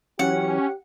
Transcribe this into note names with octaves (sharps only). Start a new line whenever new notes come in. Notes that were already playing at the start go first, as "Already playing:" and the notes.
E3 F#3 C#4 G4 F#5